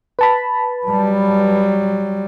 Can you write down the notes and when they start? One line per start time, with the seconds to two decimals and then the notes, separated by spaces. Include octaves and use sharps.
0.19 B4 A5 B5
0.87 F#3 G3